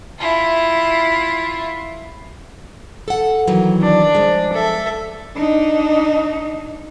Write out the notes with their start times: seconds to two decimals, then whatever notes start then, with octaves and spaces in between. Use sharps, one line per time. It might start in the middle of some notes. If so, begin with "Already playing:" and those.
0.19 E4 F4
3.08 A4 F#5
3.48 D#3 E3 F#3
3.81 D4
4.15 F3 G#3
4.52 A4 E5
5.36 D4 D#4